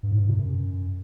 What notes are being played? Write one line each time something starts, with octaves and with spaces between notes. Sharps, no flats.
G2
A2
G2
C3
F#2